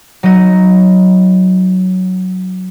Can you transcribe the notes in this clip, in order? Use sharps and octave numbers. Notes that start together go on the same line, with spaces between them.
F#3 D#4 D#5